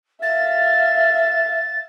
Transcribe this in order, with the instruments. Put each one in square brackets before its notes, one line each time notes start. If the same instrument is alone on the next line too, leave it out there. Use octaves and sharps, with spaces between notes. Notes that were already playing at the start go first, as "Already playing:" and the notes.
[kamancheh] E5 F5 [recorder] A6